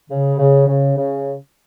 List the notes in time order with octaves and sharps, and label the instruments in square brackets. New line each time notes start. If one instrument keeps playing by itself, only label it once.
[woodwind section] C#3
C#3
C#3
C#3